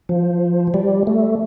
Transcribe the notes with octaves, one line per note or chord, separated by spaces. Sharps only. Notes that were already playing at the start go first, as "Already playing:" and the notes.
F3
G3
A3